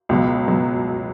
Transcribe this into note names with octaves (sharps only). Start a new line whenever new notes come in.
C#2 B2 F#3
B2 F#3